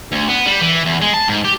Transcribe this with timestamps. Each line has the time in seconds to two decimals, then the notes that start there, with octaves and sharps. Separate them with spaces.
0.12 D2
0.29 B3
0.46 G3
0.61 E3
0.85 E2
1.02 G#3
1.14 A5
1.28 G#2
1.44 G4